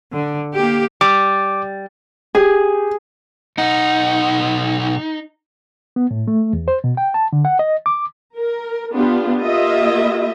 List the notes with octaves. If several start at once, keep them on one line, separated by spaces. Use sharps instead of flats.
D3
A#3 G4
G3 D6
G4 G#4
B1 D#4 F#5
B3
A2
A3
E2
C5
B2
G5
A5
D3
F#5
D#5
D6
A#4
B3 D4 F4 G4
A#3 F4 G4 D#5 E5